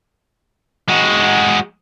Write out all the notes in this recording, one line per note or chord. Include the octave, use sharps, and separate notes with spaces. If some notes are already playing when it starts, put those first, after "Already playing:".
G#3 F#4